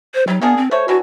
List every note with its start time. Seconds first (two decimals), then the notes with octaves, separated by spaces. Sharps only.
0.14 C5
0.28 F#3 G3 D#4
0.42 A#3 B3 D4 G#4
0.57 C4
0.71 A3 C5 C#5
0.88 E3 F#3 D4 F#4